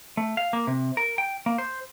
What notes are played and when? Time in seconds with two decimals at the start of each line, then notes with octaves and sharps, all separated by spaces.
0.17 A3
0.37 F5
0.53 A#3
0.67 C3
0.97 A#4
1.18 G5
1.46 A#3
1.58 C5